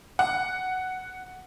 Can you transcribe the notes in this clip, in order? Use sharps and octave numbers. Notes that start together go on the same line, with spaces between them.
F#5